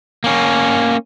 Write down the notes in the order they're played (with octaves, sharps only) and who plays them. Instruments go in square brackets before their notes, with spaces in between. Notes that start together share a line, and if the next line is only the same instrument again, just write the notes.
[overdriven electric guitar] A#3 C#4